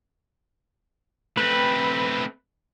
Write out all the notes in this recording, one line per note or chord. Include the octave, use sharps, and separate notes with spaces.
A3 C4 B4